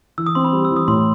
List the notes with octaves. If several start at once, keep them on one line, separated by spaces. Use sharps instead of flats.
E3 E6
D#6
C4 C6
B5
G3
E6
E3
D#6
A2 C6